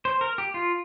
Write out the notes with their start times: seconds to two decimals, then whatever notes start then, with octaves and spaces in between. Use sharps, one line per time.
0.05 C5
0.21 A#4
0.38 G4
0.54 F4